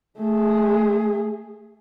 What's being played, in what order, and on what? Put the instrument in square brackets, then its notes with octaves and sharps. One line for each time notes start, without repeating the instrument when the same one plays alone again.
[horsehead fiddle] A3 G#4